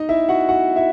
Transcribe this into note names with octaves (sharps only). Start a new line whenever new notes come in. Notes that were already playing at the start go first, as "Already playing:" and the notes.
Already playing: D#4 D#5
E4 E5
F#4 F#5
F#4 F#5
E4 E5